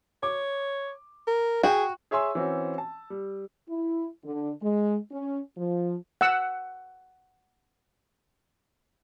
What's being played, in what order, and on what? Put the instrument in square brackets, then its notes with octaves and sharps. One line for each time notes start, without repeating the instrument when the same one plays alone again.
[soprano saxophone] C#5 [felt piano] D6
[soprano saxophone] A#4
[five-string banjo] F#4 [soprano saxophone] G#4 [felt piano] G5
[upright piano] G#4 C#5 E5 G#5 C6 E6
E3 C4 C#4 F#4
A5
G3
[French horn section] E4
D3
G#3
C#4
F3
[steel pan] F#5 E6